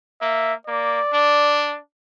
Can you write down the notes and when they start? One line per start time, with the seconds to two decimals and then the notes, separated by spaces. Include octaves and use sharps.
0.21 A#3 E5
0.67 A#3 D5
1.13 D4